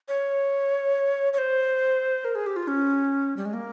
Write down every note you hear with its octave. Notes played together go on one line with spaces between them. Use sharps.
C#5
C#5
C5
A#4
G#4
G4
F4
C#4
G3
G#3
A#3